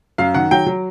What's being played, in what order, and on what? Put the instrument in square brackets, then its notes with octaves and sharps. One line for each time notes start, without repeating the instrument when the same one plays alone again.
[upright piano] F#2 F5
D#3 F#5
F#3 G5
F#3